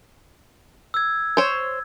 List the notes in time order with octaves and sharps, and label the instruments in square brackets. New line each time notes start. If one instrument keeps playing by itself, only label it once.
[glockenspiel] E6 G#6
[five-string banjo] C5 C#5